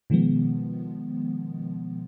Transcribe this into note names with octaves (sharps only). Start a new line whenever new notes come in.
B2 D#3 F3 G#3 B3